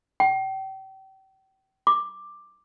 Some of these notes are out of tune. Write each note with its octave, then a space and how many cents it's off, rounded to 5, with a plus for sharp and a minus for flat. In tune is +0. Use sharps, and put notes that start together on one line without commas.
G5 -35
D6 +10